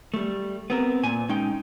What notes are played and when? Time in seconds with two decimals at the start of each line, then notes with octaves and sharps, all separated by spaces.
0.14 G3 A3
0.70 B3 C4 A#4
1.03 A#2 G#5
1.29 G#3 C#4 D#4 G5